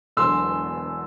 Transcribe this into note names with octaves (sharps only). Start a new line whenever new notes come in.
E1 E2 D3 F#3 C6 E6